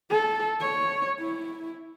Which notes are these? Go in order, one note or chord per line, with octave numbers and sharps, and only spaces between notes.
A4
C#5
E4